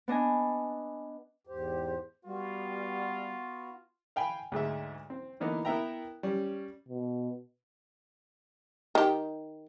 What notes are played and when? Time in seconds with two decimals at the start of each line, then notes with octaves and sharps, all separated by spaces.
0.08 B3 D4 D#5 G#5
1.47 E2 G#2 G4 C5
2.25 G3 B3 F4 F#4
4.16 F5 G5 G#5 B5
4.52 D2 G#2 G#3 E5
5.10 C4
5.40 D3 E3 A#3 B3 D#4
5.65 B3 E4 A#4 E5 G5 A#5
6.23 G3 C#4
6.88 B2
8.95 D#3 G4